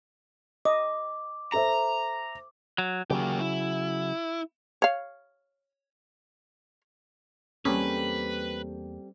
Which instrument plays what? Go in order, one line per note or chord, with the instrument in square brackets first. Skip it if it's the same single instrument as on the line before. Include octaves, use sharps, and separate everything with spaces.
[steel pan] D#5 [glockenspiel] D6
[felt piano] A4 C5 E5 [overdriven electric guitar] A#5
[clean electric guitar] F#3
[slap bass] C#3 F#3 [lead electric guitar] A#3 G4
[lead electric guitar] E4
[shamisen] C#5 F5
[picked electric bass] E2 A#3 [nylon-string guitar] G3 C4 A4 [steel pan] C#4 [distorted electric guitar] B4